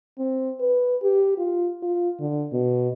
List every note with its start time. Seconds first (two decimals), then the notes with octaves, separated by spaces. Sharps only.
0.18 C4
0.60 B4
1.03 G4
1.38 F4
1.82 F4
2.20 D3
2.52 B2